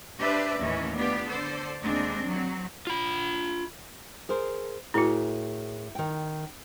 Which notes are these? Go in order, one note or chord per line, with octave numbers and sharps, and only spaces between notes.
D4 G4 B4 C5 D5 E5
D#2 A2 E3 C#4
B3 D4 F4 G4
D3 A4 C5 D5
D#2 G#3 C4 D4
F#3 C4
F4 B5
G#4 A#4 C5
A2 E4 F#4 G#4 A#4
D#3 G5